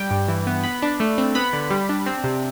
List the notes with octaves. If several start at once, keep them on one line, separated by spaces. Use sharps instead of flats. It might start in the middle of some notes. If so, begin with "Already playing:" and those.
Already playing: G3 G5
G2
E3
B3
B3 B5
D4
A3
C4
B3 B5
D3
G3
D4
C4
C3